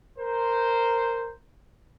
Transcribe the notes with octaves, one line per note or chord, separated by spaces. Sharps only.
A#4 C5